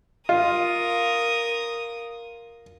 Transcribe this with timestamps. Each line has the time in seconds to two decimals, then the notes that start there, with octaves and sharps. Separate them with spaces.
0.29 F4 A#4 D#6